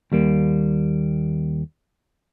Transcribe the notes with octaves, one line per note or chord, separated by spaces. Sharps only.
D#2 G3 A#3